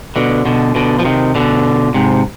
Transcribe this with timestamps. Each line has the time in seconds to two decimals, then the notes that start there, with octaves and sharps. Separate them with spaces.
0.16 B2 D3
0.45 B2 D3
0.75 B2 D3
0.99 F3
1.05 C3 D#3
1.35 B2 D3
1.94 G#2 C3